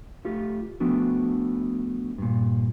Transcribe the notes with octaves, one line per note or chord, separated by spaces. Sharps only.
A3 F4 G4
F3 A3 B3 D4 F#4
G2 A#2